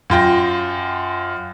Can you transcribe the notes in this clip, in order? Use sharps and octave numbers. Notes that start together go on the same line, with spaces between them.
F#2 F4 G5 A#6